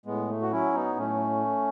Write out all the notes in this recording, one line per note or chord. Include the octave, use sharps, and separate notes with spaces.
A2 G#3 B3
A3
F#4
F#3 C#4 E4
B3 D#4
A2 A3 C#4